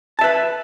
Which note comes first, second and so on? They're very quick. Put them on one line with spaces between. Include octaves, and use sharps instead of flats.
A5 E5 B4